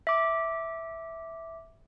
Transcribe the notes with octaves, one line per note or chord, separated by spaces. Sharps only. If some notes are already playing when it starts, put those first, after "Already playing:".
E5 D6